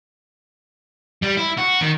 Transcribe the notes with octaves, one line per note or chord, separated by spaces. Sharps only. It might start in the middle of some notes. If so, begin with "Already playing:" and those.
G3
E4
F#4
D#3